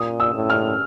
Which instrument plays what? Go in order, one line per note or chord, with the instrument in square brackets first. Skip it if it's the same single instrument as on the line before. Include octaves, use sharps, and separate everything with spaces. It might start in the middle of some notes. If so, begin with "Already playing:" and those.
Already playing: [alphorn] A#2 [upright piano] D#6
[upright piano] E6
[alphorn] A2
[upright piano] F6